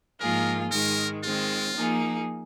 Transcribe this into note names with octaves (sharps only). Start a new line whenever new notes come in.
G#2 F3 A#3 F4 G#4 A#4
G#2 D#3 G#3 A#4
D#3 G#3 C4 F4
F3 A#3 D#4 G#4